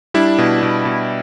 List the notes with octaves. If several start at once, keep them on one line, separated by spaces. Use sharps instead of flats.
G3 D4 E4
B2
B2
B2